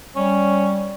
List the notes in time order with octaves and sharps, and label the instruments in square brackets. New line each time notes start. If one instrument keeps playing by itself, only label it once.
[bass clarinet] G3 [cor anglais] C#4